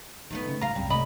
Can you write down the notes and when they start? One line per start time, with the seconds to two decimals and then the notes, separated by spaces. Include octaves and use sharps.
0.31 D#3 E3 A3 B3
0.47 C#3
0.61 F#3 F4 F5 A#5
0.76 C2 F#2 G3
0.90 C3 A3 D5 D#5 B5